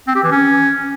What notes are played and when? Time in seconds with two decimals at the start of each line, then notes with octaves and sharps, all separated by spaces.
0.07 C4
0.15 G4
0.23 E3
0.31 C#4